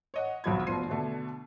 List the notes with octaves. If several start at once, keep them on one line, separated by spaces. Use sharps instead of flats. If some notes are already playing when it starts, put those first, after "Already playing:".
C#5 D#5 F#5
B1 F2 F#4 B5 G#6
F1 B2 F3 C6 C7 D#7
B2 D3 A3